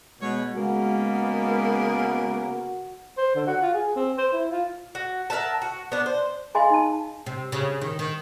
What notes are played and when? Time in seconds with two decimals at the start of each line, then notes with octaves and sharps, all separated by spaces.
0.22 B2 G#3 C#5
0.55 C#3 G#3 A#3 B3 F#4
3.18 C5
3.35 D3
3.47 F#4
3.62 F4
3.74 G#4
3.96 C4
4.18 C5
4.33 E4
4.52 F4
4.95 F#4
5.30 A#4 E5 F#5 A5
5.62 F#4
5.92 B3 D4
6.06 C5
6.55 G#4 D#5 F5 G#5 B5 C6
6.70 D#4 A5
7.26 C3
7.52 C#3
7.81 D#3
7.99 D#3